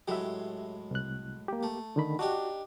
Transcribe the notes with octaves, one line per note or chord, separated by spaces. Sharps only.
A2 F#3 G#3 G4 E5
C2 F#6
A#3 G4
A3
D3 D#3 B5
D4 D#4 F#4 G4